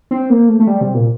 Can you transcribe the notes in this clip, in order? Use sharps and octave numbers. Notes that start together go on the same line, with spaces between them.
C4
A#3
A3
A3
G3
C3
A#2